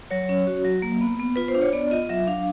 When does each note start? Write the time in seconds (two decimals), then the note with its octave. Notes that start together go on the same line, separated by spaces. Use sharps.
0.11 F#3 C#5
0.29 C#4
0.47 F#4
0.65 F#3
0.82 A#3
1.01 B3
1.19 B3
1.36 F4 B4
1.48 C5
1.55 D4
1.61 C#5
1.73 B3 D5
1.91 F4 D#5
2.09 F#3 E5
2.27 D4 F5